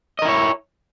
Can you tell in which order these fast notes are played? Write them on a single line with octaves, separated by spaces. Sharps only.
D#5 A#4 E4 C#5